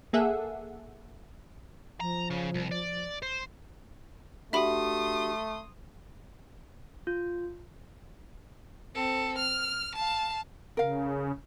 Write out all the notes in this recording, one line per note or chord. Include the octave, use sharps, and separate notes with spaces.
A#3 G#4 A4 E5 F#5
F3 A#5
C#3
C2
D5
C5
A3 D4 F#4 G4 E5 B5 C6 D#6
F4
C4 A4
F6
F5 A5
C#3 A#4 F5